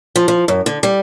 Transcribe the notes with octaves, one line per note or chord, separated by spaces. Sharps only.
F3
F3
F#2
D3
G3